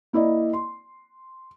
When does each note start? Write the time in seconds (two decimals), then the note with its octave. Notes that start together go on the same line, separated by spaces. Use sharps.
0.13 A#3 E4 D5 D#5
0.53 C6